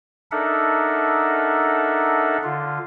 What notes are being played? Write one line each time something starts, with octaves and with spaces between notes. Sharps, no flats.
D4 D#4 A4 A#4 E5 F#5
D3 F4